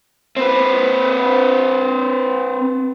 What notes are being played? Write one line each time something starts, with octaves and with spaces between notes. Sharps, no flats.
C4 B4